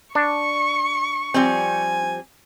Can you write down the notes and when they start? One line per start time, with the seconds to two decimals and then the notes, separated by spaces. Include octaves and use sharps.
0.15 D4 C#6
1.34 F3 G3 C4 G#5